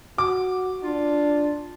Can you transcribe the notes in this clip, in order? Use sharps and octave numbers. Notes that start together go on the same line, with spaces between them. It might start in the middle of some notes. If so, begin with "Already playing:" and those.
F#4 D6
D4 F4